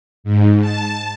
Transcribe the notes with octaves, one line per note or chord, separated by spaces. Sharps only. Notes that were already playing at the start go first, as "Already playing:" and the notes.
G#2
A5